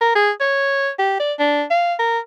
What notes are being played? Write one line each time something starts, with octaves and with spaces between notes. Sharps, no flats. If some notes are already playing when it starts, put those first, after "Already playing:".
A#4
G#4
C#5
G4
D5
D4
F5
A#4